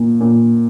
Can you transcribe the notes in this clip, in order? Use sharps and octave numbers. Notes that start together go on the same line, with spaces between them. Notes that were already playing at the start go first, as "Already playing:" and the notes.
Already playing: A#2
A#2